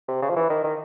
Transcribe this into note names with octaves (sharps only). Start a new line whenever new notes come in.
C3
C#3
F3
E3
D#3
D#3